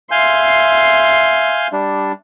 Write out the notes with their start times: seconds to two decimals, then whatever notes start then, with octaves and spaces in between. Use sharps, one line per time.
0.11 E5 F5 G#5 C6 G6
1.72 G3 D4